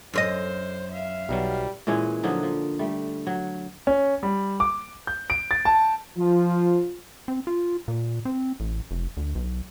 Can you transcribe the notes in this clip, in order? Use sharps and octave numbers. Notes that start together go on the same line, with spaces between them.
F#2 B4 C5 D#5
E5 F5
B1 B2 F#3 G3
A#2 E3 G#3 C#4
D3 F3 F#3 D#4
F3
G3 A3
F#3
C#4
G3
D6
G6
D7
A6
A5
F3 F4
C4
F4
A#2
C4
A1
F1
D2
B1